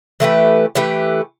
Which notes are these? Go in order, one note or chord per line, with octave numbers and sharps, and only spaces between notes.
E3 A3 G4 B4
E3 A3 G4 B4